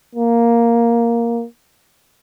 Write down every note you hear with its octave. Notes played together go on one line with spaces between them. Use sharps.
A#3